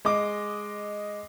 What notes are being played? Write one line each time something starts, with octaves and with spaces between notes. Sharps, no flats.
G#3 D#5 D6